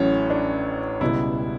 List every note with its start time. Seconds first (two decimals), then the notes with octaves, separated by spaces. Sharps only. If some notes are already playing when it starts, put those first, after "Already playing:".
Already playing: A1 A2 F#3 C#4
0.30 D4
1.01 C#2 B2 G3 E4